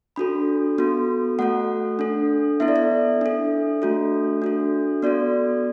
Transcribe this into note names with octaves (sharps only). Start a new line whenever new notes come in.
D4 F#4 A4 B5
B3 F#4 A4
A3 F#4 A4 F#5
D4 A4
B3 E4 A4 E5
D5
E5
D4 A4
A3 D4 F#4 A4
D4 F#4 A4
B3 F#4 A4 D5